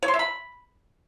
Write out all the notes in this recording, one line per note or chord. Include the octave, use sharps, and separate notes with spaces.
C#5
C6
E5
B5